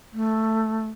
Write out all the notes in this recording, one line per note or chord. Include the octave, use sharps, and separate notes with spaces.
A3